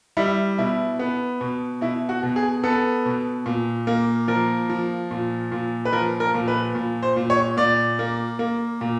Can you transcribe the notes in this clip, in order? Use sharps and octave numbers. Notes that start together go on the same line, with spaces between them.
G3 E4
B2 E4
B3
B2
B2 E4
F#4
B2
G#4
B3 A4
B2
A#2
A#3
F3 A#4
F3
A#2
A#2
B4
F3 A#4
A#4
A#2
B4
A#2
C5
A#2
C#5
A#2 D5
A#3
A#3
A#2